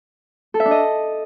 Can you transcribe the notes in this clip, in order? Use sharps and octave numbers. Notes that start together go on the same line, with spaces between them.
A4
E5
D4
D#5